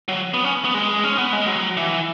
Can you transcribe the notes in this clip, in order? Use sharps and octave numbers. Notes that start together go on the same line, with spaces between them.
F#3
B3
C#4
B3
G#3
C#4
B3
G#3
F#3
E3